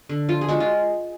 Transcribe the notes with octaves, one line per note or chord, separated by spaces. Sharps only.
D3
F3 F4
G#4
G#3 F#4
F4